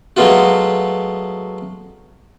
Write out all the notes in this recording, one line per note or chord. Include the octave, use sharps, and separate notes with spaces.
F#3 G#3 A3 B3 F4 F#4